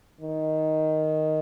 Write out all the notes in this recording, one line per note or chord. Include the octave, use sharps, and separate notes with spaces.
D#3